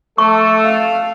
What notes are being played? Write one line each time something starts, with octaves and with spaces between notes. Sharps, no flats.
A3 A4 C#6
F5